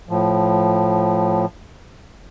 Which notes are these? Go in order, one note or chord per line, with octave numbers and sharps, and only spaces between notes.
A2 F3